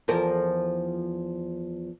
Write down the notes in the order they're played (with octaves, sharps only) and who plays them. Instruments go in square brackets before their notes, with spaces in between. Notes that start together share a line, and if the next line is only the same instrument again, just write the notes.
[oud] E2 F3 A#4